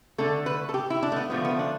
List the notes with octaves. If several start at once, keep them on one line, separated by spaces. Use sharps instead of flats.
D3 A3 A4
B4
A4
G4
E4
D4
A3
B3
D3 F3 A3 B3
B3
D4